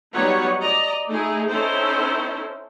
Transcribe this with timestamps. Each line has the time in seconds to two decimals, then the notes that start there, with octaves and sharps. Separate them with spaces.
0.13 F#3 G3 B3 D#4 C#5 F#5
0.62 D5 D#5 A#5
1.08 A3 D#4 E4 G#4
1.50 C4 C#4 D#4 E4 A4 C5